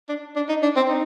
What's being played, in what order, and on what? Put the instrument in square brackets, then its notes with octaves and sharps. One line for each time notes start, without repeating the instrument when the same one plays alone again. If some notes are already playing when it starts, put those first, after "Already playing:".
[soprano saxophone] D4
D4
D#4
D4
C4
D#4